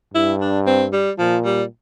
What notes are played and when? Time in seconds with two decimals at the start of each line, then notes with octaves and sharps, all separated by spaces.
0.14 G2 E4
0.41 D4
0.66 C4
0.92 G3
1.18 A#2 F3
1.45 G3